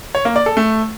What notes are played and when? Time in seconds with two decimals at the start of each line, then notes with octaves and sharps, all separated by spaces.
0.15 C#5
0.25 A#3
0.36 D5
0.46 A4
0.57 A3